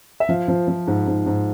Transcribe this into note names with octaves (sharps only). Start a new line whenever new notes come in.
E5
F3 F5
F3
F3
G#2
G#2
G#2